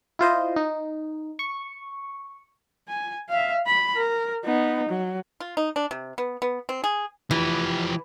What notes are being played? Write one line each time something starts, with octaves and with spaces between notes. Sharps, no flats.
E4 F4 C5 D#5
D#4
C#6
G#5
E5 F5
B5
A#4
B3 D#4
F#3
F4
D#4
D4
C3
B3
B3
C4
G#4
E3 F3 G4